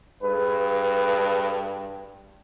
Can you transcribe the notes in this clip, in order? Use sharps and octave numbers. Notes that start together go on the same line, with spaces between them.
G2 G#4 A4 B4